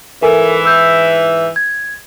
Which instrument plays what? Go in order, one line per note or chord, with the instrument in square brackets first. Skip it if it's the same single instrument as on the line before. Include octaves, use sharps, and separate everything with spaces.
[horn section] G#2 E3 [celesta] A4 A#4 G#5
[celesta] E6 G6
G#6